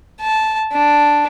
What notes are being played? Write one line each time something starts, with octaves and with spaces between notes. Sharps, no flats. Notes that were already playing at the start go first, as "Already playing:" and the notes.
A5
D4